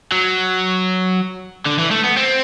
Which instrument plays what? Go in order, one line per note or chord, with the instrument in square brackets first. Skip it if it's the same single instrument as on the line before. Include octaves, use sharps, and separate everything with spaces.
[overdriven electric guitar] F#3
D3
E3
A3
B3
C4